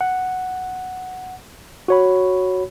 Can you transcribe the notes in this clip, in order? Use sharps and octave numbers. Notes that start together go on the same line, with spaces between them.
F#5
F#4 C#5 B5